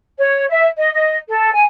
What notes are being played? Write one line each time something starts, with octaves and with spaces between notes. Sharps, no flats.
C#5
E5
D#5
D#5
A4
G#5